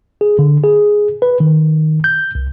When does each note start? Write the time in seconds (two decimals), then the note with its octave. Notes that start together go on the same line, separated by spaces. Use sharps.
0.21 G#4
0.39 D3
0.64 G#4
1.22 B4
1.40 D#3
2.04 G6
2.35 C2